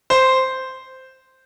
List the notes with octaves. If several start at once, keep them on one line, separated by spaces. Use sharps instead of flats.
C5